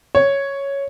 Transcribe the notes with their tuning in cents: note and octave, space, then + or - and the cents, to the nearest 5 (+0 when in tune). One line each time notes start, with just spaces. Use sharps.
C#5 +0